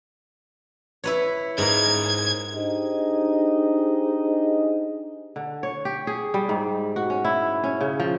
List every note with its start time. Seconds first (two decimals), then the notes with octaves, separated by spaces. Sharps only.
1.04 E4 B4 C#5
1.58 G#2 A#4 G#6
2.54 D4 D#4 G4 G#4 C5 D#5
5.36 D3
5.63 C#5
5.85 G4
6.07 G#4
6.34 G3
6.49 G#2
6.96 F#4
7.10 C#4
7.25 E4
7.64 C#4
7.81 C#3
8.00 F3